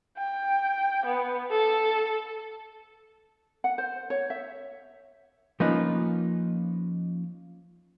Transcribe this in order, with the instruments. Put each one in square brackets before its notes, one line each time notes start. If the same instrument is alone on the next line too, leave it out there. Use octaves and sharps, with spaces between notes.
[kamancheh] G5
B3
A4
[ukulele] F#5
C5
C#5
E5
[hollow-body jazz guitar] F3 A#3 C#4 D#4 F4 B4